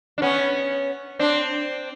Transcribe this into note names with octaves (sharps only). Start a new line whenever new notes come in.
D4
B3 C#4
C4 D4